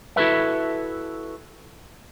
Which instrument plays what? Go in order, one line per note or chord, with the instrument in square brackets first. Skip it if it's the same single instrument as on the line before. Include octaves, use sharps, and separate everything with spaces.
[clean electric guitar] E4 F#4 A4 B4 E5